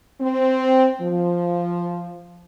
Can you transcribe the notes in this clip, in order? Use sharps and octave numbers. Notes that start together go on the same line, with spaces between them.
C4
F3